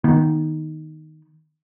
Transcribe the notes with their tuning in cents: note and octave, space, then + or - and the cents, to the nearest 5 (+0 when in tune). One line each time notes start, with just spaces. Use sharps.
D#3 +0 B3 -30